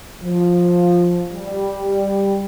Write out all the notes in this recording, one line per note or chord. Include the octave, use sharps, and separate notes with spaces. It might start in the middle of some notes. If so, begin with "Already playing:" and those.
F3
G3